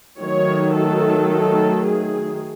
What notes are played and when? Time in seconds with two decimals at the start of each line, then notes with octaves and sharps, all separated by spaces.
0.20 D#3 F#3 A3 C#5
0.75 A4
1.84 G#4